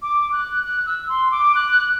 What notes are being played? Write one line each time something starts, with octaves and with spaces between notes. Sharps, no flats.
D6
F#6
F#6
E6
C6
D6
F#6